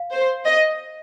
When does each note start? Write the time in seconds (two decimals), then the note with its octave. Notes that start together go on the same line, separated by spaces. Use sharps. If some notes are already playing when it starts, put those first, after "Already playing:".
Already playing: F5
0.13 C5
0.45 D#5